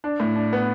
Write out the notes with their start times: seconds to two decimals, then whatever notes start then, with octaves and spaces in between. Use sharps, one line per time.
0.04 D4
0.20 A2
0.36 D4
0.53 B3